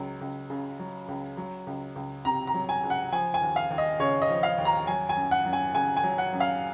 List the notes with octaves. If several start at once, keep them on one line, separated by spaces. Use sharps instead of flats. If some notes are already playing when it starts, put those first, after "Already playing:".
Already playing: C#2 F#3
C#2
C#3
F#3
C#2
F#3
C#2
C#2
C3 A#5
A#5
F#3
G#5
C#2
F#5
F3 G#5
G#5
D#2
F5
D#2
D#5
C#3 C#5
D#5
F3
F5
D#2
A#5
F#3 G#5
G#5
F#2
F#5
F#2
G#5
C#3 G#5
G#5
F#3
F#5
F#2
F5